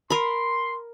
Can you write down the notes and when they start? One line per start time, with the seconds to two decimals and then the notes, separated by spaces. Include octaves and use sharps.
0.10 A#4 B5 C6